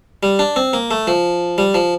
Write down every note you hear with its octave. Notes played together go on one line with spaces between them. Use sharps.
G3
D4
C4
A#3
A3
F3
G3
F3